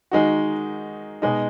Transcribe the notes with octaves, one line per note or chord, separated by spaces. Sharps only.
D#3 G#3 D#4 F#4
B2 G#3 D#4